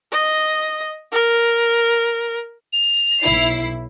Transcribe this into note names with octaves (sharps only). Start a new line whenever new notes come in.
D#5
A#4
F7
B1 E4 C7